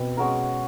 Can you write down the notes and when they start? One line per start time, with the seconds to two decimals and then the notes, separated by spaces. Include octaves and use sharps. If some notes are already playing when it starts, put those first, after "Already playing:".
Already playing: B2 C4
0.17 G#3 C#4 F#4 A#4